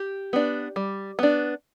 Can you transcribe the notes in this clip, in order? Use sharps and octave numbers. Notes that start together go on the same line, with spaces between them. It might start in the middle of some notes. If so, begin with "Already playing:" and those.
Already playing: G4
B3 D4
G3
B3 D4